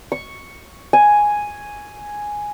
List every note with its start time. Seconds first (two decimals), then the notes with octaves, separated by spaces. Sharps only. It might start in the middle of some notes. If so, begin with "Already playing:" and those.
0.12 C#6
0.93 G#5